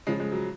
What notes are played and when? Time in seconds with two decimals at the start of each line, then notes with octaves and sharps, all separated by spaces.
0.07 C#3 F3 G#3
0.20 G#3
0.32 F#3